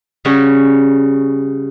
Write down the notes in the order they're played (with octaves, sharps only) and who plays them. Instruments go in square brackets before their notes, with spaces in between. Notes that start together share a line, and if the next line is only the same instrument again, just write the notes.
[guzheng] C#3 G3 C#4 F#4 C#5